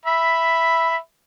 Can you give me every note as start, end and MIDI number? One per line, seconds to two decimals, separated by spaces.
0.06 0.97 76
0.06 0.97 83